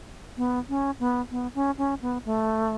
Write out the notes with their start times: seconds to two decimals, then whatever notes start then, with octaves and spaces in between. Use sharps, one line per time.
0.37 B3
0.69 C#4
1.00 B3
1.31 B3
1.55 C#4
1.78 C#4
2.02 B3
2.25 A3